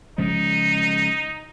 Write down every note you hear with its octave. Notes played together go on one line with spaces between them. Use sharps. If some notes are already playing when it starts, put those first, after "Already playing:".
C#3 F3 G#3 D#4